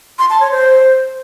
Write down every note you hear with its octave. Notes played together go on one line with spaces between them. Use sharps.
C6
A5
C#5
C5